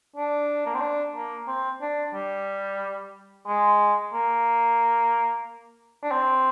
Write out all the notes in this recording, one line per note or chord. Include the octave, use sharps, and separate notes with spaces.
D4
A#3
C4
D4
A#3
C4
D4
G3
G#3
A#3
D4
C4